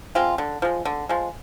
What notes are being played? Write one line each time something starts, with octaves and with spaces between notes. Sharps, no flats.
G#3 C4 F4
D3
F3 G#3
D3
F3 G#3